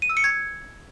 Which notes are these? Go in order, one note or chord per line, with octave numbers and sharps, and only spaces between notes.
D#7
E6
C#7
G#6